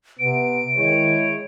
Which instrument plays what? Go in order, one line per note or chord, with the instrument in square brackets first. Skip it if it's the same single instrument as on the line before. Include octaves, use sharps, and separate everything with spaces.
[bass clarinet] C3 [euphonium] B3 [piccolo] D7
[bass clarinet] D#3 [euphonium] G#3 [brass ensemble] E4 C#5